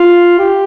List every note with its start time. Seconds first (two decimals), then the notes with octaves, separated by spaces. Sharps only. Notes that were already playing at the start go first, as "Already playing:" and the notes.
Already playing: F4
0.39 G4